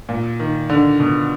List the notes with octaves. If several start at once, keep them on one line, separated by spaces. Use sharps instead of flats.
A#2
D#3
D3
B2